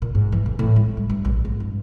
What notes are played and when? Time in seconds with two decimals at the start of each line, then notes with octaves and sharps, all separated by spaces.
0.02 A#2
0.15 G#2
0.32 E3
0.46 A1
0.59 A2
0.76 G#3
0.97 G3
1.10 G2
1.25 A#1
1.45 G#2
1.60 G2